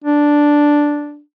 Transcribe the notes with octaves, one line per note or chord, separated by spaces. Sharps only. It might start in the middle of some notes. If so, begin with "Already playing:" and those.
D4